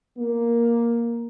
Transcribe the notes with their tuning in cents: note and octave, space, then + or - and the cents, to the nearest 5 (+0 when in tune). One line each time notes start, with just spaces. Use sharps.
A#3 +5